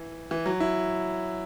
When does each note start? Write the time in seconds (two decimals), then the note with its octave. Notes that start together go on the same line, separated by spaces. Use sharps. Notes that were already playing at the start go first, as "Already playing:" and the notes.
Already playing: E3
0.31 E3
0.46 F#3
0.60 E4